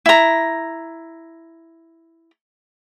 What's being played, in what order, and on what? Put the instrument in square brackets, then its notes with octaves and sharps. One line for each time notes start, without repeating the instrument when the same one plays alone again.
[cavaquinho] E4 A#5